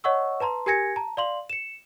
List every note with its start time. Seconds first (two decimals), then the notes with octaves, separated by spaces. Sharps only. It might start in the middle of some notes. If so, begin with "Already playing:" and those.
0.04 C#5 D#5 F#5 C#6 E6
0.40 B4 A5 A#5 C6
0.66 G4 A#4 G#5 G#6 A#6 C#7
0.96 A5 A#5
1.17 D5 F5 C6 F#7
1.50 C#7 E7